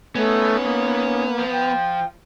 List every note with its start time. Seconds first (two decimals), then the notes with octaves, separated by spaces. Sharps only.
0.15 A3 B3 C#4 D#4
0.63 A#3
1.39 F3
1.51 G5